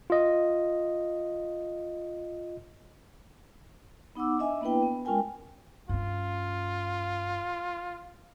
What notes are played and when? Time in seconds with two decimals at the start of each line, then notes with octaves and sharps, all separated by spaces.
0.10 F4 D#5
4.15 B3 D#4 F#5 D6 E6
4.39 D4 D#5 E5 G#5
4.61 A#3 B3 D4 E4 B4 G5
4.82 B3
5.05 G#3 C#4 F4 A#4 G5 G#5
5.89 G2 C#4 F4